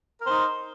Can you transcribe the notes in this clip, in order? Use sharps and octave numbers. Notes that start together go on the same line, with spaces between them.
D#4 A#4 C5